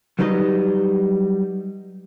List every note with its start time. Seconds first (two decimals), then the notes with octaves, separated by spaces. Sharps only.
0.19 F#3 G3 D#4 B4 C5 D#5